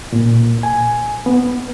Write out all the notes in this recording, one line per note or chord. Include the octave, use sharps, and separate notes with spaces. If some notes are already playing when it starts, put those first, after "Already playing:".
A#2
G#5
B3